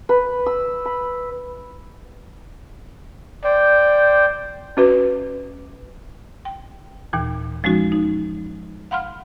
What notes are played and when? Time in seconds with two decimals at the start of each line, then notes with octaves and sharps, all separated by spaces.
0.09 B4
0.46 E6
0.85 B5
3.45 C5 D5 G5
4.77 C#4 F#4 B4
6.45 G5
7.13 D#2 A#2 E3
7.64 F3 G#3 C#4 D#4 F#4
7.92 D#4
8.91 F5 F#5 B5 C6 F6